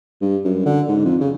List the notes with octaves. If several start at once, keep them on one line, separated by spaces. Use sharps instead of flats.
G2
F#2
D3
G#2
F2
C#3